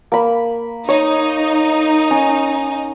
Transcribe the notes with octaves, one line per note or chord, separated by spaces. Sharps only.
A#3 B5
D#4 C#5
C#4